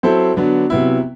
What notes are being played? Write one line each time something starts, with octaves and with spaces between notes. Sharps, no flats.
F#3 C4 E4 A4 C5
D3 F#3 B3 D4
C3 F#3 B3 E4